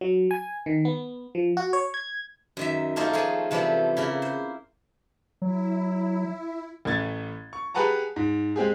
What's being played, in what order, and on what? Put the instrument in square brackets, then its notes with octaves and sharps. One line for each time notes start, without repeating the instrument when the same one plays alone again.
[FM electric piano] F#3
G#5
D#3
B3
F3
F#4
C#5
G#6
[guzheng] F#2 D#3 E5
A3 A#3 C#4 D#4 F4 C5
F3 A3 G#4 G#5
C3 E3 F3 G3 A3 C4
C#3 A#3 E4
C5
[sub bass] F#3 [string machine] E4
[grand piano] A1 A3 G#6 A6
C#6
G4 G#4 B4 F#5 A5 A#5
G#2
G#3 C4 G4 G#4